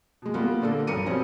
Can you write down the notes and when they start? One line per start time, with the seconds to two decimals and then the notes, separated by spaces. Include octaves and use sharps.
0.22 B2 G#3
0.34 G3 A#3 B3 F4
0.61 A#2 D3 A#3 D4 A4
0.87 B1 G2 A#4 C#7 D#7
1.06 B2 G3 C4 C#4